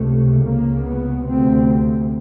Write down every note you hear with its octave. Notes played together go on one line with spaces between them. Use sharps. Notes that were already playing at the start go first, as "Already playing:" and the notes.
Already playing: C#2 C3 A3
C#2 C#3 A#3
B3
D2 C3 C4